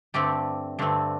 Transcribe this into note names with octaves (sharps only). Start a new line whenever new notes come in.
G2 D3 A3 C4 G4
G2 D3 A3 C4